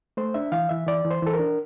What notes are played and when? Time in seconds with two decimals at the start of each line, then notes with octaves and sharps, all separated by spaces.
0.17 A3 C5
0.34 D4 E5
0.52 E3 F5
0.69 E3 E5
0.87 E3 D5
1.05 E3
1.11 C5
1.23 E3 A4
1.33 A#4
1.39 D4